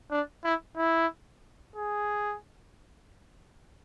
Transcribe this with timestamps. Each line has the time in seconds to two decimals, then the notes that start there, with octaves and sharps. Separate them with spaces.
0.11 D4
0.44 E4
0.77 E4
1.76 G#4